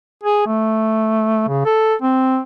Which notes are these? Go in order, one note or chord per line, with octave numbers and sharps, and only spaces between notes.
G#4
A3
C#3
A4
C4